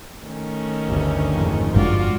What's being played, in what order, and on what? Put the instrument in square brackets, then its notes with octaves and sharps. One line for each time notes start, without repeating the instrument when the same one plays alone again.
[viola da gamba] D#3 A3 C#4
[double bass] G1 D2
F2 G#2
[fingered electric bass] G1 G2 G#3 [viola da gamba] F4 F#4 D5